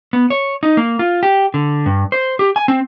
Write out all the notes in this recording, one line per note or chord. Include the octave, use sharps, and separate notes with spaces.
B3
C#5
D#4
A#3
F4
G4
D3
G2
C5
G4
G#5
C4